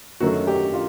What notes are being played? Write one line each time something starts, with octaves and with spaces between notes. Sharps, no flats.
F#2 D#3 F#3 A3 F#4
G4
F4